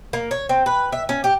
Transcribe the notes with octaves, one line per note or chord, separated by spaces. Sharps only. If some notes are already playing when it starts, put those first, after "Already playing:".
A#3
C#5
C4
B4
E5
C#4
G4